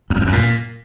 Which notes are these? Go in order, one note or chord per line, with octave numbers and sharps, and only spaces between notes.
F2
E2
F2
F#2
A#2